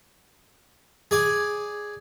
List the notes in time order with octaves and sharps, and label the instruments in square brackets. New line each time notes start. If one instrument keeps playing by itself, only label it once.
[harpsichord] G#4 D5 G#5